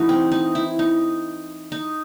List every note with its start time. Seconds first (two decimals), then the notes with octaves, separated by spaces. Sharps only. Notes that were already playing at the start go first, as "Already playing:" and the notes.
Already playing: E3 A3 D#4 F#4
0.09 C4
0.32 D#4
0.55 E4
0.79 D#4
1.72 D#4